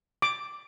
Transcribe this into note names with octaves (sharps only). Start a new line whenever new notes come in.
D6